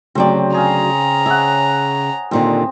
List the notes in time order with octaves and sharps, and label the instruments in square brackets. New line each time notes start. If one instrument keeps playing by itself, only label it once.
[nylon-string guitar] D2 F#3 D5 [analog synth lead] C#3 [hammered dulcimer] C4 G4
[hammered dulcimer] G#4 F5 [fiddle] A#5
[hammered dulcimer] G#4 C#5 F#5 [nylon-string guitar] E5
[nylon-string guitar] D#2 A#2 D3 [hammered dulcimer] C4